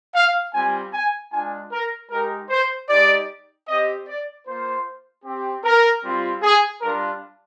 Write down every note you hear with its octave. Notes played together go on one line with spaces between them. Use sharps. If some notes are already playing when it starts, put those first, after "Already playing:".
F5
G3 C4 F4 G#5
G#5
G#3 D4 F4 G#5
A#4
G#3 D#4 G4 A#4
C5
G#3 D#4 G4 D5
C4 G4 D#5
D5
A#3 F4 C5
C4 G4
A#4
G3 C4 F4
G#4
G3 D4 F4 A#4